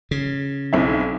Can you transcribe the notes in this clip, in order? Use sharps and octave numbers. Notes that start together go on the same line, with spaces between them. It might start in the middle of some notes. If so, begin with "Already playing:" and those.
C#3
B1 C4 E4